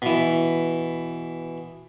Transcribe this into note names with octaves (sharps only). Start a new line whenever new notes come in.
B2 E3